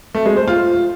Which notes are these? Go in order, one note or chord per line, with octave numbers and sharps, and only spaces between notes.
A3
G#3
C5
F4